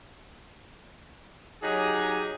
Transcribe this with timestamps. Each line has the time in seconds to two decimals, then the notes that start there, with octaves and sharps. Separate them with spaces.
1.62 F#3 D#4 G4 G#4